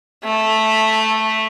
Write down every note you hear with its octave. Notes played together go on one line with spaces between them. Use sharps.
A3